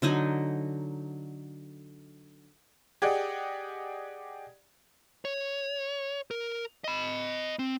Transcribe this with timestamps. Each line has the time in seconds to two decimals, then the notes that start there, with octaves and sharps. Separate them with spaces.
0.02 D3 F#3 D#4 G#5
3.02 G4 G#4 D5 D#5 F#5
5.25 C#5
6.31 A#4
6.84 D#5 B5
7.59 C4